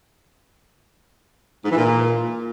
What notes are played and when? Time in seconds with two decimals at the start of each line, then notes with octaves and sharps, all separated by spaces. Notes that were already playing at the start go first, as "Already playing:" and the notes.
1.65 G#2
1.71 E3
1.77 A#2